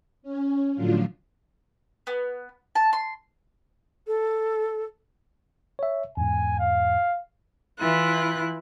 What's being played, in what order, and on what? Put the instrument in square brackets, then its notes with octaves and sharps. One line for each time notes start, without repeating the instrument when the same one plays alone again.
[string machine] C#4
A2 D3 F3 F#3 D4 F4
[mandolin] B3
A5
C6
[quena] A4
[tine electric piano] C#5 E5
[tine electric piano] E2 G#2 [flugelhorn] G#5
[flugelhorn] F5
[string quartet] E3 E4 F4 F#6